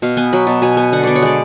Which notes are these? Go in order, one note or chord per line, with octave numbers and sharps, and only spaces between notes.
B2 F5
B3 G#5
F#3 B5
B2 A5
B2 G#5
B3 G#5
D3 F#5
B3 D5
C#5
G#3 D5